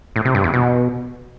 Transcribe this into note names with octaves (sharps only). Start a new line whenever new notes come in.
A2
C3
G2
E2
B2